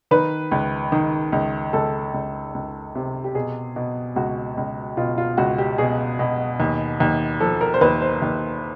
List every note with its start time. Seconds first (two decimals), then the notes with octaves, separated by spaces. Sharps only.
0.11 D#3 B4
0.51 C#2
0.92 D#3
1.32 C#2
1.73 C#2 A4
2.14 C#2
2.55 C#2
2.95 C3
3.24 G4
3.35 B2 G#4
3.76 B2
4.16 C#2 F#4
4.57 C#2
4.97 B2 F4
5.18 F4
5.37 C#2 F#4
5.58 G4
5.78 B2 G#4
6.19 B2
6.60 D#2
7.00 D#2
7.40 F3 A4
7.61 A#4
7.74 C5
7.81 D#2 B4
8.02 C5
8.22 D#2